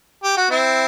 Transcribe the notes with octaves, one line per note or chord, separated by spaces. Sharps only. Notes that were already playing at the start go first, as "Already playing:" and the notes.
G4
F#4
C4 E4